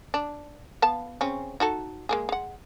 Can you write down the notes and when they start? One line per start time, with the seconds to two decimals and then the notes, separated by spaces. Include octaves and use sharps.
0.14 D4
0.82 B3 F5 A5
1.21 C#3 C4 C#4
1.60 D#4 F#4 A4
2.09 G#3 A#3 G#4
2.29 G#3 F#5